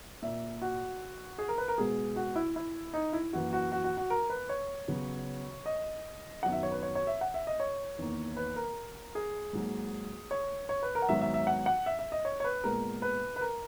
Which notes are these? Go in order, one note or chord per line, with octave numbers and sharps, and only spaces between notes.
A#2 A#3 E5
F#4
G#4
A#4
B4
A#4
B2 G#3 B3 G#4
F#4
E4
E4
D#4
E4
F#2 E3 A#3 F#4
F#4
F#4
F#4
F#4
A#4
B4
C#5
C#3 F#3 B3
D#5
F#2 D#3 F#3 B3 F#5
E5
C#5
B4
C#5
C#5
E5
F#5
E5
D#5
C#5
E2 D#3 A#3
B4
A#4
G#4
G#2 F#3 A#3
C#5
C#5
B4
A#4
F#5
G#2 D#3 F#3 B3 E5
E5
E5
F#5
F#5
E5
E5
D#5
C#5
C#5
B4
A#2 G#3 B3 A#4
B4
B4
A#4